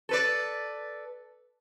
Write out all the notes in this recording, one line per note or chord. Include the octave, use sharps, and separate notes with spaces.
A4 B4 D5